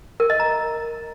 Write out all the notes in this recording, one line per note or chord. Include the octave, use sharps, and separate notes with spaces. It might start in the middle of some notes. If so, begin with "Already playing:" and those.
A#4
D#5
A#5